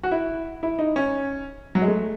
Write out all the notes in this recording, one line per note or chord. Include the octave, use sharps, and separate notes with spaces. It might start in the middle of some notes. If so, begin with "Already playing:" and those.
F#4
E4
E4
D#4
C#4
F#3
G#3
A3